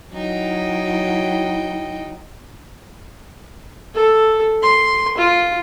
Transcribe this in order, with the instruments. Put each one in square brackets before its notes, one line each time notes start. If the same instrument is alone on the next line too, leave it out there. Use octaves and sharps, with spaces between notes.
[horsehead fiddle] F#3 E4 [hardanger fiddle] D#4 G5
[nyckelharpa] A4
C6
F4